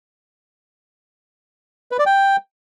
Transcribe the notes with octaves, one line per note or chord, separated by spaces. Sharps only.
B4
D5
G5